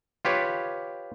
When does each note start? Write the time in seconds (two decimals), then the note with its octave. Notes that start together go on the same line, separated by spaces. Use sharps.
0.25 F4 G4 B4 C#5